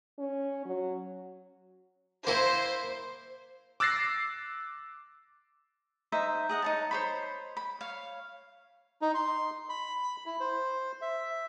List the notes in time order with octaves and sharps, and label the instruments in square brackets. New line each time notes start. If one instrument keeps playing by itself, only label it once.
[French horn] C#4
F#3
[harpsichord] A#3 E4 [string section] C5
[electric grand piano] D6 E6 F#6 A6 A#6 C7
[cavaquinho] D#4 C5 E5
G#4 D#5 F#5
D#4 C#5 A5
C5 C#5 B5
B5
C#5 F5
[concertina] D#4
C6
B5
E4
C5
E5